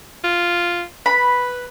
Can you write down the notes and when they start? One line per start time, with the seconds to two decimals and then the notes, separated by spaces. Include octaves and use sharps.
0.24 F4
1.06 B4 B5